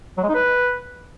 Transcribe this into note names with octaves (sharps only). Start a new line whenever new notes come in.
F#3
G#3
D#4
B4